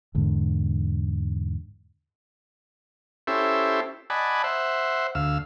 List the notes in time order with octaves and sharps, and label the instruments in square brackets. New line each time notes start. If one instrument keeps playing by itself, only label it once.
[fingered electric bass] E2 G#2 D3
[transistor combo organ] C#4 E4 G4 A4 C5 E5
D5 D#5 F#5 G#5 A5 B5
C5 E5 F#5
D2 F5 E6